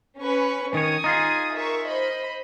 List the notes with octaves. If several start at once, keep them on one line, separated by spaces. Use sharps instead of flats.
C#4 B4 C#6
D#3 C#5 G#5 D#6
D#4 F4 G#4
A#4 E5 C#6
C5 D#5 B5